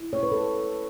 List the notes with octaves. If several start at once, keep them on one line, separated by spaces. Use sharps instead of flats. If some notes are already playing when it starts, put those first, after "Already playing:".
Already playing: E4
G#3 C#5
B4
A4